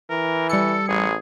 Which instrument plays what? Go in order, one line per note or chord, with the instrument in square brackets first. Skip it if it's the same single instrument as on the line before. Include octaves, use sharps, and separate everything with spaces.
[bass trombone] E3 [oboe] A#4
[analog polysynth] G3 C#7 [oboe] A4
[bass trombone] A1 [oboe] G#4